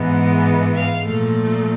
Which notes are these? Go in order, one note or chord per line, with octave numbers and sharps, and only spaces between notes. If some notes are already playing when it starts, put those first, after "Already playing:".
Already playing: G#2 E3 G#3 B3
F5
A#2 F3 A3